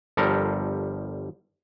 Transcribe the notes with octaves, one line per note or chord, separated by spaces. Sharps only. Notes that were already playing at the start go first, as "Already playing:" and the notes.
G1 F3 G3 A4 A#4